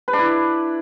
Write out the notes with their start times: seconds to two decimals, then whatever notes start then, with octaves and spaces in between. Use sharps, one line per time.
0.08 B4
0.13 D4
0.19 E4